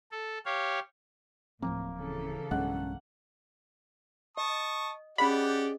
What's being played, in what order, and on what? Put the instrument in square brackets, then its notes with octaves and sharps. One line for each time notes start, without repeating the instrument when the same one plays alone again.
[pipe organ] A4
G4 C#5 F5
[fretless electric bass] D1 F3 C4 [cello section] A2 [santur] A#3
[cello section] C#3 E3 A4
[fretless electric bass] B1 G2 G#3 [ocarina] C#4 [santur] F#5
[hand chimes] D#5 [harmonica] A5 C#6 D#6
[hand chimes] C#4 G#4 D#5 [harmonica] G4 D5 F#5 [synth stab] B5